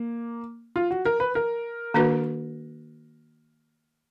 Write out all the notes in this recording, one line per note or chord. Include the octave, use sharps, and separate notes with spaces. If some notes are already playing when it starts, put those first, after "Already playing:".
Already playing: A#3
F4
F#4
A#4
B4
A#4
D#3 A#3 D4 F#4 B4